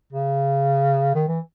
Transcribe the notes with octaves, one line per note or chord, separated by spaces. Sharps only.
C#3
D#3
E3